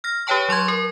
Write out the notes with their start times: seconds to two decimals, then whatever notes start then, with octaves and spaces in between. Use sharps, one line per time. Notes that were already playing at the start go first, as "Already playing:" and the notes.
0.04 F6 A#6
0.27 G4 B4 C#5 G5 A5 C#6
0.49 F#3 C6 C#6 G#6
0.68 A#4